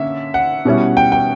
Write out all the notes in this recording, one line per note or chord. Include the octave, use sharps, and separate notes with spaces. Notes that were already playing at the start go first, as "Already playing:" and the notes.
Already playing: D3 A#3 C#4 E5
F#5
B2 G3 C#4 E4
G5
G5